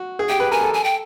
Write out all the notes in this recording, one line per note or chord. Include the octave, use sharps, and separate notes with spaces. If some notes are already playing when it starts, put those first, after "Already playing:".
Already playing: F#4
G#4
G4 G5
B4
A#4 G#5
A4
G#5
G5